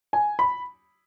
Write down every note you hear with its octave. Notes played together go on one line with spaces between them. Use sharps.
G#5
B5